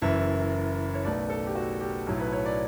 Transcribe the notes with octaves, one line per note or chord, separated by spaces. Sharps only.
F#1 F#2 E3 E5
C#5
B1 B2 A3 D5
A4
G4
F#4
G4
B1 A2 F#3 A3
B4
C#5
D5